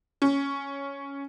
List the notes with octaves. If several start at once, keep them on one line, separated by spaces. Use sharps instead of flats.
C#4